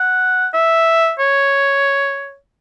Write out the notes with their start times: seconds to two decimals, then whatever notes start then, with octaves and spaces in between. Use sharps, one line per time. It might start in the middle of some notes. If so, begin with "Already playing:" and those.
Already playing: F#5
0.54 E5
1.19 C#5